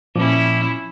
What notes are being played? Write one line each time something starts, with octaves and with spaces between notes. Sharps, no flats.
A#2 F3 C#4 E4 D6